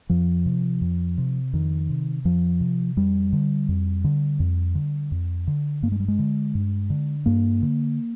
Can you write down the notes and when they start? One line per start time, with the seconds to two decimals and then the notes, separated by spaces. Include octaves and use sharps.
0.10 F2 F3
0.46 C3
0.81 F2
1.18 C3
1.53 F2 D#3
1.90 C3
2.25 F2 F3
2.61 C3
2.97 F2 G3
3.33 D3
3.69 F2
4.04 D3
4.40 F2
4.75 D3
5.11 F2
5.47 D3
5.82 G2 A#3
5.92 G#3
6.00 G3
6.08 G#3
6.19 D3
6.55 G2
6.90 D3
7.26 G2 A#3
7.62 D3